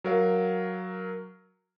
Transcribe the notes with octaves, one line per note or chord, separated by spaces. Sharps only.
F#3 A#4 F5